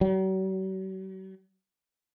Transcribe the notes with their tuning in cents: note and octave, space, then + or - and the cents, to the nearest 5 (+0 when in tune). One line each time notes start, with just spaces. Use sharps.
F#3 +45